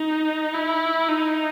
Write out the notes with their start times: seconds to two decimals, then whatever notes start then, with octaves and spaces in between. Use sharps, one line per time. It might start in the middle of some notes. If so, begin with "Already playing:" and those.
Already playing: D#4
0.53 E4
1.08 D#4